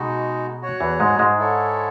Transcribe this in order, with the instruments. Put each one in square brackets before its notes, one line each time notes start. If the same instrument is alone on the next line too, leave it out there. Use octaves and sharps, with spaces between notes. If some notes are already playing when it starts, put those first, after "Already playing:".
Already playing: [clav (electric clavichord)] B2 [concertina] G#3 D#4 F#4
[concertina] F#4 C#5 F#5
[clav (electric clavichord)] E2 E3
G#2 G#3
G#2 G#3
[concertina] E4 A4 C#5